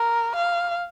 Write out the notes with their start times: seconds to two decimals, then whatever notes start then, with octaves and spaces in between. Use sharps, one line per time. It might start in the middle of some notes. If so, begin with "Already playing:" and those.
Already playing: A#4
0.36 F5